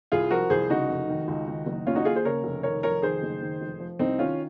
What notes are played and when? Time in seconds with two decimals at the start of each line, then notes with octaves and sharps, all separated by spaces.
0.12 C2 F4 G#4
0.31 F3 F#4 A#4
0.50 C2 G#4 C5
0.70 C#3 D#4 F#4
0.89 F1
1.09 D#3
1.28 C#2
1.48 D#3
1.66 F#1
1.86 D#2 C#4 F4
1.95 D#4 F#4
2.05 D#2 F4 G#4
2.15 G#4 C5
2.25 C#3 A#4 C#5
2.44 F1
2.63 D#3 A#4 C#5
2.83 F1 A#4 C#5
3.02 D#3 G#4 C5
3.23 F#1
3.41 D#3
3.61 F1
3.80 F3
3.99 C2 C4 D#4
4.18 D#3 C#4 F4